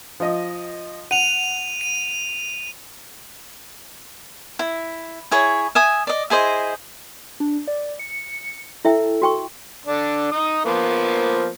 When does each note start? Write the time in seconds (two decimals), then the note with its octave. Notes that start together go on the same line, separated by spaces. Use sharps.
0.20 F3 D#5
1.11 F#5 D#7 F7
1.81 D#7
4.59 E4
5.31 E4 G#4 C#5
5.75 E5 G#5 D#6
6.07 D5 D#5
6.30 E4 G#4 C5 D#5
7.40 D4
7.67 D5
7.99 C#7
8.85 E4 A4 E5 G5
9.22 F#4 G5 C#6
9.86 D3 D4
10.32 D#4 D#6
10.65 F3 A#3 B3